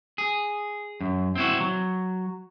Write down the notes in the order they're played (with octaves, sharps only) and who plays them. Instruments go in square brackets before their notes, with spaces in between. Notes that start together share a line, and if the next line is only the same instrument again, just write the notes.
[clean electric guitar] G#4
F#2
C4 E4 F#4
F#3